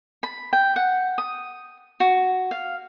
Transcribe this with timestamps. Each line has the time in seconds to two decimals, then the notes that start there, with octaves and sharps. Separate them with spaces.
0.23 B5
0.53 G5
0.76 F#5
1.18 D#6
2.00 F#4
2.51 F5